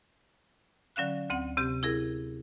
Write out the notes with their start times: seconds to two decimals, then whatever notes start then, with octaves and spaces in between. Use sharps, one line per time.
0.96 D3 F#3 C#4 F5 F#6
1.30 D2 C4 F#5
1.57 C3 C4 G4
1.83 E4 G#4 A#4